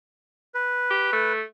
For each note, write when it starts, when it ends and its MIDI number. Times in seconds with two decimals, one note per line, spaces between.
0.55 1.32 71
0.91 1.10 67
1.13 1.42 57